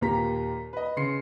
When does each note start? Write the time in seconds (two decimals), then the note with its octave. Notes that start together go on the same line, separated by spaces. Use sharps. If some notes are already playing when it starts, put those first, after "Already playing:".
0.01 D#2 A#2 A#3 G4 A#5 B6
0.73 B4 D#5
0.97 C#3 C6 C7 C#7